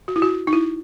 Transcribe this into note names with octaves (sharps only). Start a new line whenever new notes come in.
F#4
E4
F#4
D#4
E4